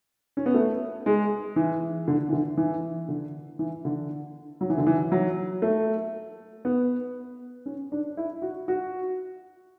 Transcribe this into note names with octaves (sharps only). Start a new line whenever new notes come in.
C#4
B3
A3
G#3
E3
D3
E3
D3
E3
D3
E3
D3
F#3
E3
D3
E3
F#3
A3
B3
C#4
D4
E4
F#4
F#4